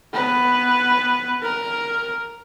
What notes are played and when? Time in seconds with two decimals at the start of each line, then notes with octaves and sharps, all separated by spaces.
0.14 B3 B4
1.43 A#4